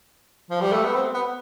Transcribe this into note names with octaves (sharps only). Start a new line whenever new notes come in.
F3
G3
A3
B3
C4
B3